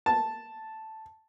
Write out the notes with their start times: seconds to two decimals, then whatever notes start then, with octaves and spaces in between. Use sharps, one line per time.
0.06 A5